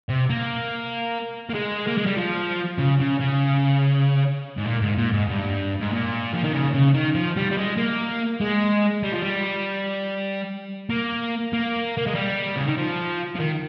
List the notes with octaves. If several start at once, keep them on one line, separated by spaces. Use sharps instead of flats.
C3
A#3
A#3
G#3
A#3
G#3
G3
F3
C#3
C#3
C#3
G#2
A#2
G#2
A#2
G#2
G2
G#2
A#2
F3
D#3
C#3
C#3
D#3
F3
G3
G3
G#3
A#3
G#3
G3
F3
G3
A#3
A#3
A#3
G#3
G3
C#3
D#3
F3
F3
D#3